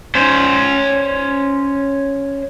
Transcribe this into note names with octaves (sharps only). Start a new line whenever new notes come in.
C#4 C5